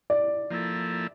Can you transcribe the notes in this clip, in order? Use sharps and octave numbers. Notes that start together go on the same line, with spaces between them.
D5
F3 A#3 E4 A4